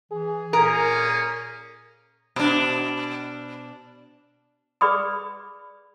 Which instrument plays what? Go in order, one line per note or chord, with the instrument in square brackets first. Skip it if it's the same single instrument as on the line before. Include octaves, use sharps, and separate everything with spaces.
[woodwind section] E3 [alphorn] G#4
[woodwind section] A#2 D#6 [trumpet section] A#3 C#4 [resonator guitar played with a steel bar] A#4
[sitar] B2 D4
[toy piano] G#4 B4 D5 B5 D#6